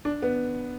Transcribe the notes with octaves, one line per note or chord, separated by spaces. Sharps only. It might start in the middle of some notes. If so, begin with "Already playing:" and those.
D4
B3